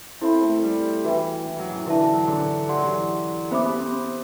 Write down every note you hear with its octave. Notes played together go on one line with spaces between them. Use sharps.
C4 E4 A4 E5 B5
A3
G3
E3 F#4 B4 E5 G5 B5
E3
F#3
E3
D3 E4 B4 E5 A5
E3
F#3
D3
E3 G4 D5 F#5 C6
F#3
E3
B3 G4 C5 E5 B5 D6
B3
C4
C4